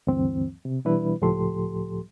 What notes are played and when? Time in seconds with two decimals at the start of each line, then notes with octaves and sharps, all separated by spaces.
0.07 D2 G2 E3 C4
0.65 C3
0.85 B2 E3 G3 D4 E4 B4
1.21 C#2 A2 F3 G4 A4 C6